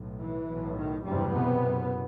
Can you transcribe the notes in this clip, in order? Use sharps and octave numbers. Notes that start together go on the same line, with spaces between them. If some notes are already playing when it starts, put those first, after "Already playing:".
Already playing: B1 A2
E3
B1 A2
D#3
F#1 E2 G2 C3 G3
B2 B3
F#1 F#2